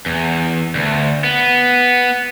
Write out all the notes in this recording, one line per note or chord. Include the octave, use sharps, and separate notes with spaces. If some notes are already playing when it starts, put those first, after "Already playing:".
E2
D2
B3